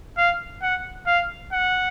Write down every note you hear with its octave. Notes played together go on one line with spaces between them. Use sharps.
F5
F#5
F5
F#5